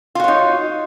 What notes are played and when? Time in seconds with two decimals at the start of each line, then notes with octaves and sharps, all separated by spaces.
0.15 F4
0.20 F#4
0.24 C#5
0.28 D#4